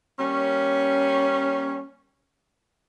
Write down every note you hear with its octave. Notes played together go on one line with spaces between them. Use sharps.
G3 A#3 C#4